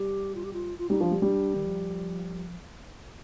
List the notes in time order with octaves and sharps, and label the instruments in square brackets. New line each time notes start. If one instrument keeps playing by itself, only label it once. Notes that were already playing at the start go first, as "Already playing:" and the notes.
Already playing: [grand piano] G3 [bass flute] G4
[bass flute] F4
G4
F4
F4
[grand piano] G3 [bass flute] D#4
[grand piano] F3 [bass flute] D4
[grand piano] G3
[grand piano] G3 [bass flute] D4
[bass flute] D#3
F3